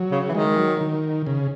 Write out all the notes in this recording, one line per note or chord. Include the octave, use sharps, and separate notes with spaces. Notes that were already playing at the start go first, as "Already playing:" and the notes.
Already playing: F#3
C#3
E3
D#3 G#3
F#3
D#3
C#3